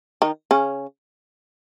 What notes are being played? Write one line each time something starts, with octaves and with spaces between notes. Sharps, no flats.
D#3 D#4
C#3 C#4